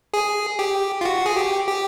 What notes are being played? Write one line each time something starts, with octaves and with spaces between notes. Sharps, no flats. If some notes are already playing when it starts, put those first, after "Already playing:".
G#4
G4
F4
F#4
G#4
G4
G4